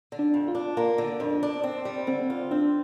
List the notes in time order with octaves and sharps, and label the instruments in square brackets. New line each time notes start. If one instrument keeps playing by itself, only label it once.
[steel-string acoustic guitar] D3
[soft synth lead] D4
[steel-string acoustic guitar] F2
[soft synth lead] F4
[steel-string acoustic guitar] D4
[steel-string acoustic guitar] A#3 [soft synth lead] F4
[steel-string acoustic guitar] D3
[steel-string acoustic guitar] F2 [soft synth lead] D4
[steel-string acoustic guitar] D4
C4
G3
[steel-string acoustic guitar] D3 [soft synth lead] C4
[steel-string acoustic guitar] F4
[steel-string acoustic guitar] C4 [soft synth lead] D4